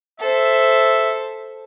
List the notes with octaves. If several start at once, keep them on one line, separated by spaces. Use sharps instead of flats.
A4 C5 E5